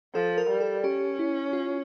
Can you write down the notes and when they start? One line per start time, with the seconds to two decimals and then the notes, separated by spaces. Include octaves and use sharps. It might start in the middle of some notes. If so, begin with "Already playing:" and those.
0.14 F3 A4
0.38 A#4
0.50 G3
0.60 A4
0.84 C#4 G4
1.19 E4
1.53 F4